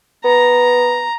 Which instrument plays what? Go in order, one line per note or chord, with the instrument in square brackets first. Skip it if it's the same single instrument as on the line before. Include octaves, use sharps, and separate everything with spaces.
[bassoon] B3 [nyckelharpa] A#5